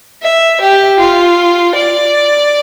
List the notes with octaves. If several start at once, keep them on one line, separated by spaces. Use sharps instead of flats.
E5
G4
F4
D5